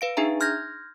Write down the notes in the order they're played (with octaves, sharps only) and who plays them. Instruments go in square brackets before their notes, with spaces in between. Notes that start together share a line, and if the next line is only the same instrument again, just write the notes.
[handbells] B4 F5 D7
D4 D#4 G#4 E5 A#5
C6 F6 G6 G#6 A#6